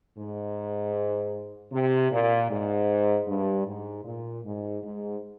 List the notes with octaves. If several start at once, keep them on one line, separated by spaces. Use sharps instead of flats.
G#2
C3
A#2
G#2
G2
G#2
A#2
G#2
G#2